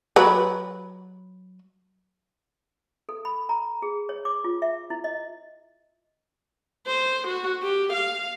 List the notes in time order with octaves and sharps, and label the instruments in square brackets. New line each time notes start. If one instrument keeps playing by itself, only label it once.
[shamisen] F#3 B4 B5
[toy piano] A4
B5
A#5
G#4
C#5
D6
F4
E5
E4
D#5
[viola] C5
F#4
G4
F5